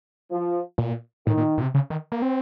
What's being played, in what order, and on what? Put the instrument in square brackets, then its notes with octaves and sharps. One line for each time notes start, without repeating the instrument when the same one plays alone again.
[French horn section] F3
[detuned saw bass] A#2
[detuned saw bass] A2 [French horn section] D#3
[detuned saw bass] A#2
A#2
C3
C#3
D#3
A#3
C4